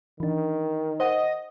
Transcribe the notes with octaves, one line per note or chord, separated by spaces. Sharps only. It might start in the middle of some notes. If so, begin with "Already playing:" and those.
D#3 E3 D4
C5 D#5 F#5